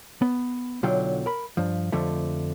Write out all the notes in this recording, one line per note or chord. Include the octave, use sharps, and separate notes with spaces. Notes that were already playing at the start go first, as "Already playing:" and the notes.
B3
B1 D3 F#3 F4 G5
A#4 B5
G2 F3
F2 D3 F3 A3